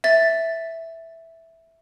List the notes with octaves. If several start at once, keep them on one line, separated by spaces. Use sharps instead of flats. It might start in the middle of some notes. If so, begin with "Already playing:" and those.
E5 A6